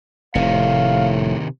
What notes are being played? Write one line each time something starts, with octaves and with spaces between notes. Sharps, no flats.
F1 A2 C3 D#3 F5